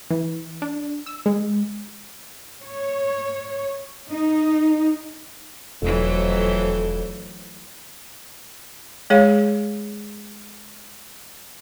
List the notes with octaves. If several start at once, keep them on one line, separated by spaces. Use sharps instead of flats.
E3
D4
E6
G#3
C#5
D#4
E1 F2 E3 F#3 A3
G#3 G#4 C#5 F5